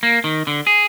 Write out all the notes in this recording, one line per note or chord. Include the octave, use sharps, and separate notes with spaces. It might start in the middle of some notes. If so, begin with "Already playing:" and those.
A#3
D#3
D3
G#4